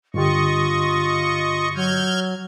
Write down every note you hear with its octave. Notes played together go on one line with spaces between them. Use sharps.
G2 D3 F4 G4 D#5 C#6
F#3 F6 G6 G#6